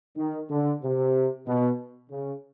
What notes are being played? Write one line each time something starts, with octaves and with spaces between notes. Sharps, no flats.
D#3
D3
C3
B2
C#3